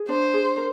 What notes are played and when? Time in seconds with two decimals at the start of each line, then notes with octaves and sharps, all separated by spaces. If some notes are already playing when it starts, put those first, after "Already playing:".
Already playing: G#4
0.09 D4 C5
0.34 G#4
0.57 A#4